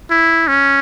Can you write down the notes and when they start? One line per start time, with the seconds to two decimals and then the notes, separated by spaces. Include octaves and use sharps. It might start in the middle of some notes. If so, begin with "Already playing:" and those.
0.10 E4
0.47 C#4